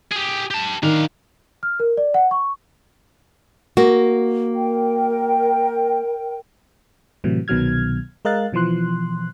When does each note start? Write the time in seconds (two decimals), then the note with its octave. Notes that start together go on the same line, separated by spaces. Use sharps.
0.11 G4 G#4
0.51 G4 A5
0.83 D#3 D4 F5
1.63 F6
1.80 A#4
1.97 D5
2.14 F#5
2.31 C#6
3.77 A#3 F#4
4.54 A#4 G5
7.24 A2 C3 E3 F#3
7.48 C2 B2 D#3 F#3 F6 G#6
8.25 G#3 A#4 D#5 F5 F#6 A6
8.53 B2 E3 F3 C6 F#6